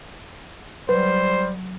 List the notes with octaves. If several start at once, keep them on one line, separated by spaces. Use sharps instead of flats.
F#3 G3 B4 C5